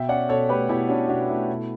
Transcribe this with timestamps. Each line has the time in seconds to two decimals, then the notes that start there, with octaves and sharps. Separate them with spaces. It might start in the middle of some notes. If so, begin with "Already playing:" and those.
Already playing: B2 E5 G5
0.09 C#4 D5 F#5
0.29 B2 A4 C#5
0.49 A3 G4 B4
0.69 B2 E4 G4
0.89 C#4 D4 F#4
1.09 B2 D4 F#4
1.29 A3 E4
1.49 B2